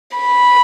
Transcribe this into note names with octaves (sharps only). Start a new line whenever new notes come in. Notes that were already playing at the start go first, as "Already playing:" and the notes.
B5